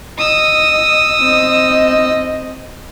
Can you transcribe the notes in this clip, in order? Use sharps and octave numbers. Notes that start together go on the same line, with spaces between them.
D#5 D#6 E6
C4 D#5